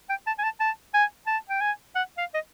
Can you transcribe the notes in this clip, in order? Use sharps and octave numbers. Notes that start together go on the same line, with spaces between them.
G5
A5
G#5
A5
A5
G#5
A5
G5
G#5
F#5
F5
D#5